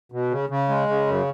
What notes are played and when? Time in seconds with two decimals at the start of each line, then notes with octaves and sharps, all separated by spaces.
0.12 B2
0.31 C#3
0.49 C#3
0.69 G#3
0.88 C#3
1.07 F#2